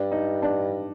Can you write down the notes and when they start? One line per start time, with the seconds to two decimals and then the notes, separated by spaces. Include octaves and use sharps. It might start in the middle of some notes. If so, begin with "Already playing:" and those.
Already playing: G2 D4
0.11 D#4
0.42 D4